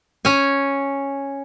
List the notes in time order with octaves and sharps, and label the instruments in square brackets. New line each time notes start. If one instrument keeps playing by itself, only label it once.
[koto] C#4 G#5